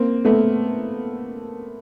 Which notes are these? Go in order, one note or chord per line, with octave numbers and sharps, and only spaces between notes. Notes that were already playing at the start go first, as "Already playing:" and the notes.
Already playing: A#3 C4
A3 B3